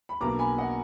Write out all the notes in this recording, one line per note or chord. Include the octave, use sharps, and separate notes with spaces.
B5
B1 B2 A#3 D4 A#5 D6
G#5 B5
D#5 F#5